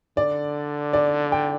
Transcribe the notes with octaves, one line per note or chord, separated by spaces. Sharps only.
D3 D5
D5
G5